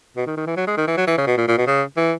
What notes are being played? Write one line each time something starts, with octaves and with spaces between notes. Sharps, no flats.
B2
D#3
D#3
E3
F#3
G#3
D#3
E3
F#3
E3
C#3
B2
A#2
A#2
B2
C#3
E3